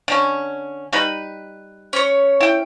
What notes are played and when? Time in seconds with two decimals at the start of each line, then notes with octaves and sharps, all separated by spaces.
0.08 D3 C#4
0.93 G3 D#4 B4
1.93 C#4 C#5
2.41 E4 G5